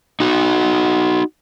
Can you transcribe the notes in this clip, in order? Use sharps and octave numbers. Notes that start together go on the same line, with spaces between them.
D#4 F#4